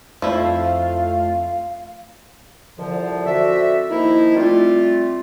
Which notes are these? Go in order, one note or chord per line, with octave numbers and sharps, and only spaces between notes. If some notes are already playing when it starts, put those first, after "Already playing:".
F2 F3 A3 E4 F4 F5
C2 A#2 D3 F3
C4 F#4 A4 D5 E5
D#3 F3 A#3 D#4 E4
G3 A3 C4 F4